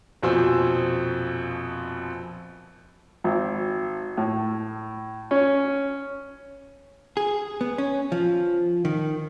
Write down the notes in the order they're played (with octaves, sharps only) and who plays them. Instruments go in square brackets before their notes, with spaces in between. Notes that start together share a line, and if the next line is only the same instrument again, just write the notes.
[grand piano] A#1 F2 B2 C5 G#5 E6
[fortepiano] G#1
A2
C#4
[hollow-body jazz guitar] G#4
B3
C#4
F3
D#3